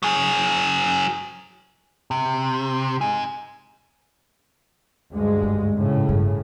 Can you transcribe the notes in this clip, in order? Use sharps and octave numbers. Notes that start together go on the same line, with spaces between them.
F#3 G#4
C3
D#4 G#4
D2 G2 G#3
G#2
A2 C#3
G2